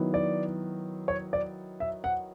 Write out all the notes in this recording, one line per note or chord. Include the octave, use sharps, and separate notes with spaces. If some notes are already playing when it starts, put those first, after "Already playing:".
Already playing: D#3 F#3 B3 E4
D5
C#5
D5
E5
F#5